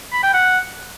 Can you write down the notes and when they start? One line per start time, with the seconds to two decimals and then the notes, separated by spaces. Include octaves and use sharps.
0.13 B5
0.23 G5
0.34 F#5